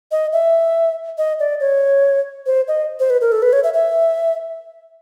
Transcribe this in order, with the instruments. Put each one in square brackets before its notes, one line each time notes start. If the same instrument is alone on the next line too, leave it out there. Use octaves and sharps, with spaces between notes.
[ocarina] D#5
E5
D#5
D5
C#5
C5
D#5
C5
B4
A#4
A4
B4
C#5
E5
E5